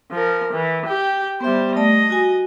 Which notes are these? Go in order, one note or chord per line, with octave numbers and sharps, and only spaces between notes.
F3 A#4
E3
G4 G5
G3 B3 C5 E5
A3 D5 D#5 A5
F#4 G#5